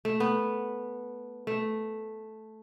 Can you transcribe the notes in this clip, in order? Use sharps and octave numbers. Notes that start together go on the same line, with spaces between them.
A3
B3
A3